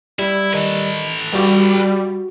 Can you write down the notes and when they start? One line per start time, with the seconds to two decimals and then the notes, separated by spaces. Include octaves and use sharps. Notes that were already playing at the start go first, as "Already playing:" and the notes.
0.19 G3 E4
0.54 D#3 A4 B4
1.33 G2 G3 F#4 G4 D6